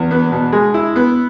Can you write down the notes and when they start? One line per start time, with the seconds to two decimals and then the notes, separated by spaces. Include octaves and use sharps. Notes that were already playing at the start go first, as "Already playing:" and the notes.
Already playing: E2
0.11 B3
0.32 B2
0.52 G#3
0.74 E4
0.96 B3